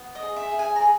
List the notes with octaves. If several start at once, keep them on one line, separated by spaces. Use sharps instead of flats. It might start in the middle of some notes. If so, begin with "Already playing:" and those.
Already playing: B3
D#5
G#4
E5
G#4
G#5
A#5
G#4 G#5